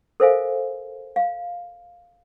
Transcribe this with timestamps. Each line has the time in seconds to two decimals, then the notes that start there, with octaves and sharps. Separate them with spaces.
0.20 A4 A#4 C5 E5 F5 G#5
1.16 F5